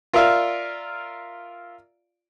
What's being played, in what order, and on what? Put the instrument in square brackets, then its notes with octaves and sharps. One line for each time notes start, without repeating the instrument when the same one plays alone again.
[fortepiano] F4 A#4 D5 E5 F5